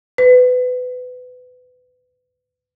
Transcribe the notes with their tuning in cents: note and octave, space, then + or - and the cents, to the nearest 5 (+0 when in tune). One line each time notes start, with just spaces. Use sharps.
B4 +25